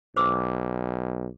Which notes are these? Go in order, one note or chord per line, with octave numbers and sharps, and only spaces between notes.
B1 C5 D6 E6